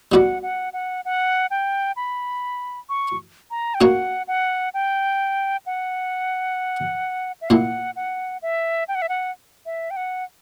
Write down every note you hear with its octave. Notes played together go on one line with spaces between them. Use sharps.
G3 B3 F#4 B4 D5 F#5
F#5
F#5
F#5
G5
B5
C#6
A#5
G5
A#3 C#4 F#4 A#4 C#5 F#5
F#5
G5
F#5
E5
A#2 A#3 E4 F#5
F#5
E5
G5
F#5
E5
F#5
E5
G5
F#5